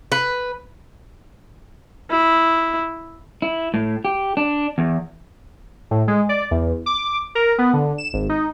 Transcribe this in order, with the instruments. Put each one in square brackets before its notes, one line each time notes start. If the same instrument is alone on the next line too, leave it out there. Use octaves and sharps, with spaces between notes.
[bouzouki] B4
[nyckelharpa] E4
[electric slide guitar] E4
A2
G4
D4
E2
[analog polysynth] A2
G#3
D5
E2
D6
A#4
B3
D3
E7
G#1
D#4